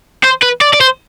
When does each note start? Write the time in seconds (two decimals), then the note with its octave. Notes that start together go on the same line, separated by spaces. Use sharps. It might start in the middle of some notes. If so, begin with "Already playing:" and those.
0.23 C5
0.42 B4
0.61 D5
0.74 D5
0.81 C5